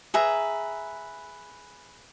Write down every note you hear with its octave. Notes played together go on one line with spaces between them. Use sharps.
G#4 B4 E5 A#5